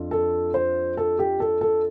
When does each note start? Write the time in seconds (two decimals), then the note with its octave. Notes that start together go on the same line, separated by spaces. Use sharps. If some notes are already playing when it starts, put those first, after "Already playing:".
Already playing: F2 F3 D4 F4
0.11 A4
0.54 C5
0.97 A4
1.19 G4
1.40 A4
1.61 A4